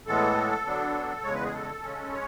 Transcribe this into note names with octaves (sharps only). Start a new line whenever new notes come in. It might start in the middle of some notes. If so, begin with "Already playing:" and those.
A2 E3 G#3 B3 A4
D3 F#3 B3 D4
E2 C#3 G#3 C#5
B4
G#4
A4
C#3 G#3 C#4
C#5